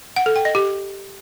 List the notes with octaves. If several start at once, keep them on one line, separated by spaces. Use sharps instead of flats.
F#5
A4
G5
D#5
G4